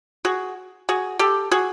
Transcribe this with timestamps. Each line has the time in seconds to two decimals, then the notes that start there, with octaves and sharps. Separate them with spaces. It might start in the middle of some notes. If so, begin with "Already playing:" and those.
0.25 F#4 G#4
0.89 F#4 G#4
1.19 G4 A4
1.51 F#4 G#4